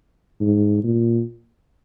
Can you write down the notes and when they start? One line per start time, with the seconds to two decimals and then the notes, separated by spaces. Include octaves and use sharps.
0.41 G#2
0.84 A#2